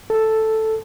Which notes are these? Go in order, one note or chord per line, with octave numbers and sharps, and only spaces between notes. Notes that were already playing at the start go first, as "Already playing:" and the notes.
A4